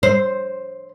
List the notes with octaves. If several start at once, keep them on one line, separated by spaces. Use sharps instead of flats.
C5